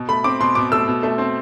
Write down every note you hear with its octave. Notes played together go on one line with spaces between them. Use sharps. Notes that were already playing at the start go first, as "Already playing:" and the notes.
Already playing: B2
A3 B5
C4 D6
B2 C6
B2 D6
A3 E6
B2
A3
C4